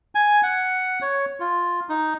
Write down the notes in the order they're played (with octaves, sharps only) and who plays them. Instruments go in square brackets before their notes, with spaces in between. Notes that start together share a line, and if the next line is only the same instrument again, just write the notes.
[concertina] G#5
F#5
C#5
F4
D#4